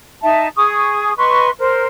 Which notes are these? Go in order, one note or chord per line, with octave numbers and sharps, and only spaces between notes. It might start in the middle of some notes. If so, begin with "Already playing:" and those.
D#4 E5 A5
G#4 C#6 D#6
B4 D#5 C6 C#6
A#4 C5